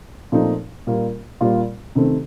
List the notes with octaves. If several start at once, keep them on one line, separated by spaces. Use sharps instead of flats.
A#2 F3 A3 C4 D#4
A#2 G3 A#3 F4
A#2 G3 A#3 F4
C3 D#3 A3 C4